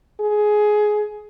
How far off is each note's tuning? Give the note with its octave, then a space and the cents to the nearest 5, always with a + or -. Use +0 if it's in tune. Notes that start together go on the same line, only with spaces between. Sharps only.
G#4 +15